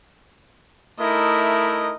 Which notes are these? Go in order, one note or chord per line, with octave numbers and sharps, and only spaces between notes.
A3 D#4 E4 A#4 D#5